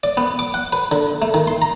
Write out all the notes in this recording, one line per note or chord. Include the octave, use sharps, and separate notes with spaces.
D5
B3
D6
F#5
B4
D3
A3
D#3
C6
A#5